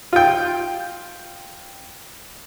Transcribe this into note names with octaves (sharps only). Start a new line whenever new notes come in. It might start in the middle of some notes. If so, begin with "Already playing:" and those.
F4 G5